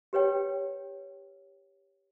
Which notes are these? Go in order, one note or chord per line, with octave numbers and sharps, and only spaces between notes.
G4 B4 C#5 G5